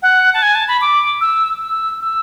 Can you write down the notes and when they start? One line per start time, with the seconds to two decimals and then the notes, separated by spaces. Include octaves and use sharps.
0.02 F#5
0.34 A5
0.42 G#5
0.55 A5
0.68 B5
0.81 D6
1.21 E6
1.61 E6
2.01 E6